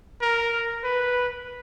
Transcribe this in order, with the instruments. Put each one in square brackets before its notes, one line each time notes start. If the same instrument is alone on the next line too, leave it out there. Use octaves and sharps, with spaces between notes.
[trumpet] A#4
B4